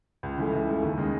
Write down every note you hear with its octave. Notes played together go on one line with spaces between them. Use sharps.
C#2
C#3 E3 A3
C#2
C#3 E3 A3
D#2
C#3 G#3 D#4